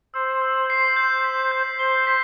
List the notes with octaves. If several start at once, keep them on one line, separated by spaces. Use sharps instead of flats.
C5 E6
E6
C7
G6
B6
G6
C5 G7
B6